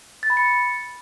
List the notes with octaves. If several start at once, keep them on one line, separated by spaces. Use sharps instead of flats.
A6
B5
C#7